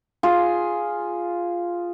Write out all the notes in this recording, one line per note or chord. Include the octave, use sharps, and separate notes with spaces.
F4 G#4